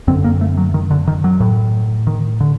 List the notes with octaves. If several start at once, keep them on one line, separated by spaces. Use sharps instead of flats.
F#2 D3 C4
A#3
A3
F#3
D#3
D3
D#3
F#3
A2
D#3
D3